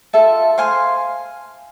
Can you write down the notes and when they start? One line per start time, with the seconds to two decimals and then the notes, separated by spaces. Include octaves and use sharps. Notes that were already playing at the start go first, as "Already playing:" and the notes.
0.13 F4 A4 E5 A5
0.58 C5 F5 G#5 C6